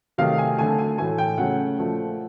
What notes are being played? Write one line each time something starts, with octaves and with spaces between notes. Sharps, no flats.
C3 D#3 F#3 A3 F5
G#5
D3 F#3 A3 G#5
G#5
A2 E3 A3 G#5
G5
C#3 F#3 A3 F#5
A#2 F3 A3